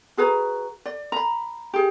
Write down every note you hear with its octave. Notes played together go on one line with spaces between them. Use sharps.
F#4 G#4 B4 A#5
D5
A#5 B5
G4 G#4